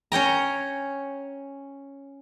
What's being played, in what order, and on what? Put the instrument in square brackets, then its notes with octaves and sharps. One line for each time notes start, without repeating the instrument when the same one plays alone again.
[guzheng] C#4 C#5 G5 A#5